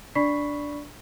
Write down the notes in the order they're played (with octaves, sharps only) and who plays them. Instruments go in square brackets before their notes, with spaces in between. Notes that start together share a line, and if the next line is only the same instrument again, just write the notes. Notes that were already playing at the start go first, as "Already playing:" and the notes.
[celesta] D4 D5 B5 C#6 B6 C7